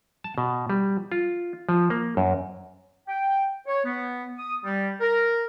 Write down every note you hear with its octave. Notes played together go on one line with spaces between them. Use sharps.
A5
B2
G3
F4
F3
A#3
F#2
G5
C#5
B3
D#6
G3
A#4